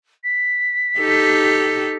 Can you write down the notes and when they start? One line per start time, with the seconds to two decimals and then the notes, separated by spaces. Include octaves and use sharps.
0.24 B6
0.98 D#4 G4 A4